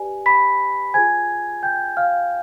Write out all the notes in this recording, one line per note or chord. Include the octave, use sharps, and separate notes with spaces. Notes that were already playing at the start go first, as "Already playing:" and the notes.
Already playing: G4 B4 D5 G#5
B5 B6
F4 G#4 C5 G#5 G#6
G5 G6
F5 F6